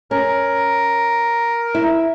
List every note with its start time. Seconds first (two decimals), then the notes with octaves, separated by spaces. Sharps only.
0.11 C#4 A#4
1.75 E4